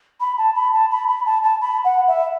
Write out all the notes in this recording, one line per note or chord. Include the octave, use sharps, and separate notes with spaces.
B5
A5
B5
A5
B5
B5
A5
A5
B5
F#5
E5